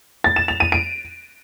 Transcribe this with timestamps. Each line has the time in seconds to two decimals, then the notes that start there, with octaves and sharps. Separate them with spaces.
0.24 A6
0.36 E7
0.48 F7
0.60 D#7
0.72 D7